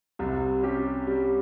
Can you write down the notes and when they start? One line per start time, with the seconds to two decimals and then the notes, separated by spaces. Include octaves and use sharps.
0.19 C2 C3 G3
0.63 C#4 G4
1.07 G3